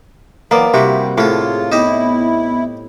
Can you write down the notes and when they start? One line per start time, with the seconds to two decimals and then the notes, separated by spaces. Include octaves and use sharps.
0.51 E3 F#3 A#3 B3 D5
0.74 C3 G3 E4 F#4 G4
1.18 A2 A#3 F4 G#4 A4 C5
1.72 B3 D#4 E4 G4 D#5